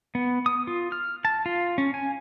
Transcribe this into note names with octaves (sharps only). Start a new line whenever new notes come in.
B3
D#6
F4
F6
A5
F4
C#4
G#5